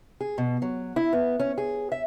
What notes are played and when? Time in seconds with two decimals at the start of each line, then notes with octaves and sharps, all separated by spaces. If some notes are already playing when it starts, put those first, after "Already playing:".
0.20 G#4
0.38 B2
0.62 F#3
0.96 E4
1.13 B3
1.40 C#4
1.58 G#4
1.92 E5